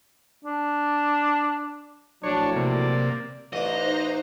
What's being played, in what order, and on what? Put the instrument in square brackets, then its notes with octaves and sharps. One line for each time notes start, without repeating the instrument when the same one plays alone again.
[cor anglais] D4
[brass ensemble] A#1 A2 F#3 [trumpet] D4 [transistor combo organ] C#5
[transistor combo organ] C3 A#3 [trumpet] D5
[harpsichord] A1 D5 [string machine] D#4 C5 A#5 [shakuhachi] B4 [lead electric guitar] D#5